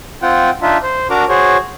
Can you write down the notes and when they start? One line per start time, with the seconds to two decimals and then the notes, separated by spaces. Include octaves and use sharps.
0.22 C4 F4 F#5 G5
0.62 D4 D#4 F4 E5
0.83 C5
1.10 D4 F#4 A#4 A#5 D6
1.29 F#4 G#4 C5 C#5